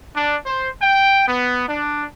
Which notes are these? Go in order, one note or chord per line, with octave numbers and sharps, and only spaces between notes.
D4
C5
G5
B3
D4